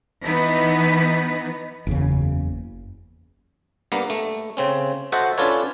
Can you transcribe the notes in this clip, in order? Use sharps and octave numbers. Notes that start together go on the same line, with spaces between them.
E3 B3 D#4 B4
F#1 E2 C#3
G2 A#3 B3
A3
C#3 C4 C#4
F#4 A4 C5 D#5 E5 F#5
C#4 D4 F4 A4 B4 C#5